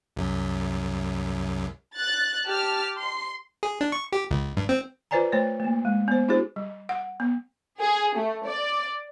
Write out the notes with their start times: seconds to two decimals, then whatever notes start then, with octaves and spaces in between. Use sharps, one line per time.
0.16 C2 F#2
1.97 F#6 A6
2.46 G4 A5 F6
2.98 C6
3.63 G#4
3.81 D4
3.92 C#6
4.12 G4
4.31 C#2
4.57 G2
4.69 C4
5.11 F4 B4 C5 D5 G#5 A#5
5.32 A3 C5 C#5
5.60 A3 A#3
5.85 G#3
6.08 B3 C5
6.28 D4 E4 F#4 G#4 C5
6.56 G3
6.89 F#5
7.20 B3
7.79 G#4
8.16 A3
8.47 D5